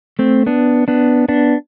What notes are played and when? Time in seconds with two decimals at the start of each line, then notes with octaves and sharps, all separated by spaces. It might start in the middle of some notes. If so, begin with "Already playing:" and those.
0.19 A3 C4
0.46 B3 D4
0.88 B3 D4
1.28 B3 D4